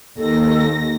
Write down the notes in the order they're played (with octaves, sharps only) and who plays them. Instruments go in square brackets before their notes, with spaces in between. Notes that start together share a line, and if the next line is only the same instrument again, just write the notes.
[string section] D#2 A#6 [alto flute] A4